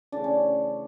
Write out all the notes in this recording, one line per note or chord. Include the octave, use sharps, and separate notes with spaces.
C#3 E3 A3 D4
C#4